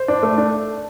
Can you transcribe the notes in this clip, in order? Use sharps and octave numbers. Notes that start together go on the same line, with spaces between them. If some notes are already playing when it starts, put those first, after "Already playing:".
Already playing: C5
D4
A3
D4